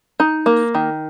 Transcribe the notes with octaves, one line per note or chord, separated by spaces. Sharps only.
D#4
A#3
D#3